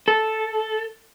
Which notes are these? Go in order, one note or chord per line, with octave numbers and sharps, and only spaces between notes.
A4